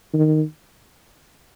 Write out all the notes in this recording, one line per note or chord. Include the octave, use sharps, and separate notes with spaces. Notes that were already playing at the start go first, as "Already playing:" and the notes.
D#3